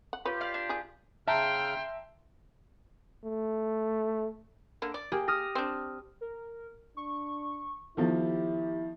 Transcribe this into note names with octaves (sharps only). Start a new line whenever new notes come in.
F#5
F4 G4 B4 C#5
D5 F5
D4
D#3 G#4
C#3 E5 G5 A5 A#5 C6 F6
A3
D3 A#3
D5
A#3 G4 G#4
D#6 F6 A#6
C4 D4
A#4
D4 C#6
D#3 F3 B3 E4 G4 A4